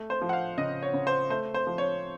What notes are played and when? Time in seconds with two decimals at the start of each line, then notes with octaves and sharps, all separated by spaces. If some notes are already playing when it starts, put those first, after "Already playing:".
Already playing: A3
0.10 C5
0.22 F3
0.29 F#5
0.33 F5
0.57 C#3 D#5
0.82 C#5
0.93 C#3
1.07 C5
1.30 A3 C5
1.54 C5
1.67 F3
1.78 C#5